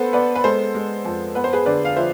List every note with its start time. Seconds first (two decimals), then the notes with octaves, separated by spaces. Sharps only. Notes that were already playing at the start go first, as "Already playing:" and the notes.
Already playing: B3 A4 B4 C5
0.13 B3 B4 D5
0.35 B4
0.44 G#3 A4 C5
0.75 G#3
1.05 F2
1.35 B3 B4
1.44 C5
1.53 G#4 B4
1.66 D3 B4 D5
1.85 F5
1.96 F3 C5 E5